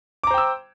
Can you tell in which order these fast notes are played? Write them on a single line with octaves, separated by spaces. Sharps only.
D6 A#5 C5 G5 E6